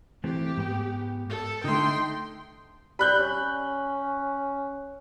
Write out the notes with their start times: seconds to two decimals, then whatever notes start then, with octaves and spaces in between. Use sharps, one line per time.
0.24 E3 A3 C4 G4
0.57 G#2 B3 G5
1.29 A4
1.64 D3 A3 D#4 G5 C6
2.99 G3 B5 F#6 G6
3.19 C#4